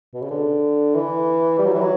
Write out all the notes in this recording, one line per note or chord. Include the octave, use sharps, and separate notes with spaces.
B2
C#3
D3
E3
G3
F#3
E3
F#3